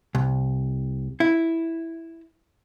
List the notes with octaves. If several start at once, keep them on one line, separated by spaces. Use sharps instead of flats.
C2
E4